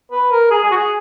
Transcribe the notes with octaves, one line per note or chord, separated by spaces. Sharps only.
B4
A#4
G#4
G#4
F#4
G#4